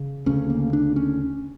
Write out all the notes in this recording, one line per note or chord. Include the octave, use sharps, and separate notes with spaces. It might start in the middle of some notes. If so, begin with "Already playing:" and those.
Already playing: C#3
D2 C#3 C#4
A#3
D4
C#4